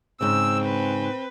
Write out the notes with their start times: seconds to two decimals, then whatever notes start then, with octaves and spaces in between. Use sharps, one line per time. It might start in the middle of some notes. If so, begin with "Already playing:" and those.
0.21 G#2 C#3 C4 E6
0.65 B4